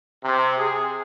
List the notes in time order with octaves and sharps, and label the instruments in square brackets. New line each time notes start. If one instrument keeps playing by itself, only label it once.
[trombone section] C3
G#4